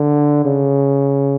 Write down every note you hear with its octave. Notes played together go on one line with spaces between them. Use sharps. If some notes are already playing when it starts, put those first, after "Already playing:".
Already playing: D3
C#3